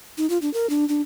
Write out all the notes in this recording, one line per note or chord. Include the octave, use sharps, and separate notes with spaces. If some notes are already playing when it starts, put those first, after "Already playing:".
D#4
F4
D4
A#4
D4
D4